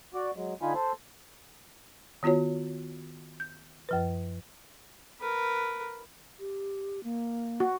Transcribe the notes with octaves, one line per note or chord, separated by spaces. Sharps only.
F#4 D5
F#3 G#3
D3 D#4 F4 G#5 B5
A4 C5
D#3 B3 F4 F#4 C#5
G6
F#2 F3 B4
A#4 B4
G4
A#3
F#4